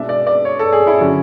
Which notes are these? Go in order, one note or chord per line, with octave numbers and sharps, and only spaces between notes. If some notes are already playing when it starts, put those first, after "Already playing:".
Already playing: B2 G#3 D4 E5
D5
D5
C#5
A4
G#4
E4
D3 F#3 C#4